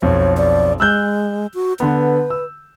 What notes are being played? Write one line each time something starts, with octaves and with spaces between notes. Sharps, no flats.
B1 F2 C#5
D5
G#3 E6 F#6 G6
F#4
D3 B3 B4
E6